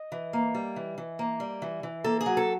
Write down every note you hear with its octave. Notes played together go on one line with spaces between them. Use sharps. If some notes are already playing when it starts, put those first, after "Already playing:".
Already playing: D#5
E3
A#3
G3
E3
E3
A#3
G3
E3
E3
A#3 A4
G#4
F#3
A4